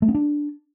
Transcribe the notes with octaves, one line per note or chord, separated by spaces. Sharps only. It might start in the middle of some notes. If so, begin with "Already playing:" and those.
A3
C#4
D4